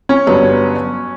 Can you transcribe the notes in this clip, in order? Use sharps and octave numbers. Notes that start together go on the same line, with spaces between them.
C#4
G1 G2 F#3 B3